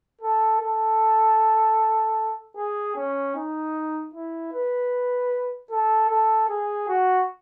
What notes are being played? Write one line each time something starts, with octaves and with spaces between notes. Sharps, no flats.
A4
A4
G#4
C#4
D#4
E4
B4
A4
A4
G#4
F#4